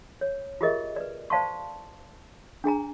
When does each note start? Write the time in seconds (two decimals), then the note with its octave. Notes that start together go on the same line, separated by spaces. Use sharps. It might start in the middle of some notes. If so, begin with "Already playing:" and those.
0.21 C#5
0.61 F4 G4 G#4 A#4 D#5 E5
0.96 B4 D5
1.30 C5 D5 F5 A5 C6 C#6
2.64 D4 G#4 G#5 A#5